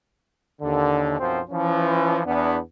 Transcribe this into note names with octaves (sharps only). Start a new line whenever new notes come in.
D#2 D3
B1 F#2 F3 F#3 C4 C5
E3 F3 C#4
E2 B3 D4